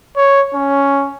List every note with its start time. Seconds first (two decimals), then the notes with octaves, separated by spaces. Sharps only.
0.17 C#5
0.55 C#4